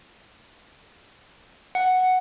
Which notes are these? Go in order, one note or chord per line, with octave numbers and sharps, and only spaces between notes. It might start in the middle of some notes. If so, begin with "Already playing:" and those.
F#5